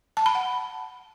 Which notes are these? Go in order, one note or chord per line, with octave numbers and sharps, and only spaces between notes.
A5
B5
F#5